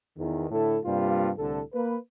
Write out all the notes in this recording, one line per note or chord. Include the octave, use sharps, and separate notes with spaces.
E2 D#3
A2 D3 E4 A4
G2 C3 G3 A#3 F4
C2 A2 D3 A4
A#3 B4